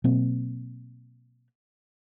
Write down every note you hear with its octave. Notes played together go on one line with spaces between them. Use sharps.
B2 F#3 A#3 C4